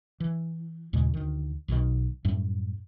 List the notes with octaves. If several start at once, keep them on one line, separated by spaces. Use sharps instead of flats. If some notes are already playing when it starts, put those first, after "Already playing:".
E3
D#2 A#2 C#3 G#3
D2 D#3
B1 B2 D3 D#3
F#2 A2 G3 A3